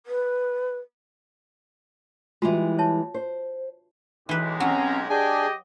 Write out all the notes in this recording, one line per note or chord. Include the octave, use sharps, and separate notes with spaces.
B4
E3 G3 G#3 F4 F#4
C#5 E5 A5
C5
B1 E3 G#3 G4 B4
F#3 C4 C#4 A#5
D4 G4 G#4 D#5 G5 G#5